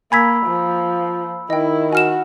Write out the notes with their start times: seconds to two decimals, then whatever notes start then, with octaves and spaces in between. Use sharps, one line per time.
0.12 A#3 G#5 B5 E6 G#6 B6
0.46 F3
1.50 D#3 E4 D#5 G5
1.93 F#4 G#5 F6 E7